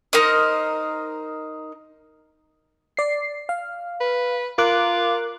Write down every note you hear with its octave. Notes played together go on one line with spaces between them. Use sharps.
D#4 A#4 C5 D#5
D5 C7
F5
B4
F4 A#4 D6 F#6